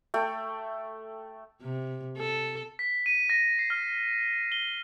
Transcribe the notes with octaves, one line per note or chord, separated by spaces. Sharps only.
A3 G5
C3
A4
B6
D#7
A#6
C7
F6
G7